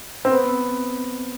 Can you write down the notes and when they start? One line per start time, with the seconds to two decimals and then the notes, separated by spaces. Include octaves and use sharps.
0.25 C4
0.32 B3